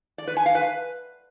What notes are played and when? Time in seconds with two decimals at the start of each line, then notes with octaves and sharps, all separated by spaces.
0.18 D5
0.27 B4
0.37 G#5
0.46 F5
0.55 B4